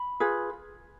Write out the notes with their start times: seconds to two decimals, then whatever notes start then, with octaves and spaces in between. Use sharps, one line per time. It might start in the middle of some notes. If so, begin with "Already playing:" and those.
Already playing: B5
0.20 F4 G#4 B4